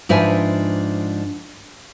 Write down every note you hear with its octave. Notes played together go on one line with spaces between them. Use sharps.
G#2 F3 D4 B4 E5 G#5